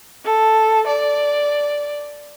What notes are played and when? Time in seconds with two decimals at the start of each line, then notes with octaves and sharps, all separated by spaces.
0.25 A4
0.87 D5